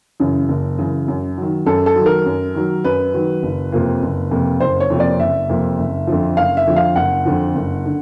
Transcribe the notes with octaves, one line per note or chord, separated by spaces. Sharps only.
F#2 C#3 E3
F#1
F#2 C#3 E3
F#2
D#3 F#3
F#2 A4
A4
D#3 F#3
A#4
F#2
D#3 F#3
F#2 B4
D#3 F#3
F#1
F2 C3 F3 A#3
F#1
F2 C3 F3 A#3
F#1 C5
C#5
F2 C3 F3 A#3
D5
F#1 E5
F2 C3 F3 A#3
F#1
F2 D3 F3
F#1 F5
E5
F2 D3 F3
F5
F#1 F#5
F2 D3 F3
F#1
D3